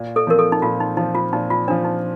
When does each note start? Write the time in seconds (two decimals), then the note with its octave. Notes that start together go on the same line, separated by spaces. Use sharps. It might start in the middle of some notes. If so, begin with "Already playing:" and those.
Already playing: A#2
0.16 A4
0.27 F3 C4 A#4
0.39 A4
0.52 D#4
0.62 A#2 F4
0.80 D#4
0.97 F3 C4 D#4
1.15 F4
1.33 A#2 D#4
1.50 F4
1.67 F3 C4 D4
1.84 D#4